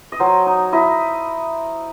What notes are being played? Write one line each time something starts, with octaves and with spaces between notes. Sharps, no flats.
D#5
F#3 C5
D#4
E4 D#5